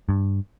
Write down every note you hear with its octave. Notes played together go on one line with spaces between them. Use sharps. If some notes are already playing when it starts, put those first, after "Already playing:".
G2